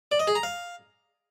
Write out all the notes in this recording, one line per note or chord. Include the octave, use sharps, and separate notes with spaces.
D5
D#5
G#4
A#5
F5